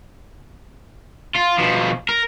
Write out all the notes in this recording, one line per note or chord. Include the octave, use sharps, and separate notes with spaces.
F4
B2 F3
A#4